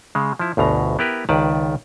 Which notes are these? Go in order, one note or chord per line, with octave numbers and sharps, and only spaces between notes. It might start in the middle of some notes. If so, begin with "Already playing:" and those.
C#3 G#3
F3 E4
G1 D2 B2 A#5
B3 E4 G4 A#4 B4
C#2 D#3 B4 D5 A5